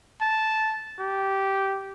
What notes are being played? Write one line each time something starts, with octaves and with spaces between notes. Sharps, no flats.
A5
G4